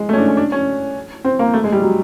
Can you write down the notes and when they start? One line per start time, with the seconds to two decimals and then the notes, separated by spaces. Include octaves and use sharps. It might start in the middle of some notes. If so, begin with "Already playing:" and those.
Already playing: G#3
0.09 A3
0.13 C#4
0.18 D4
0.28 C#4
0.37 D4
0.52 C#4
1.24 C4
1.39 A#3
1.53 A3
1.64 G#3
1.72 G3
1.82 F#3